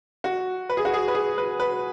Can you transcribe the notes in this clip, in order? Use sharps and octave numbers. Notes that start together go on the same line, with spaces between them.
F#4
B4
G#4
F#4
G#4
B4
G#4
B4
B4